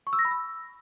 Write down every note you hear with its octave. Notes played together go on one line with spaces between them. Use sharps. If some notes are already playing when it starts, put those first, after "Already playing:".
C#6
E6
A#6
B5
E6